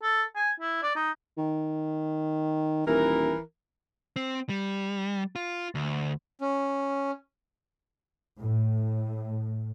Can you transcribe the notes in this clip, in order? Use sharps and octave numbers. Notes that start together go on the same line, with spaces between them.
A4
G#5
E4
D5
D#4
D#3
D#1 E3 A#4
C4
G3
F4
D2
C#4
A2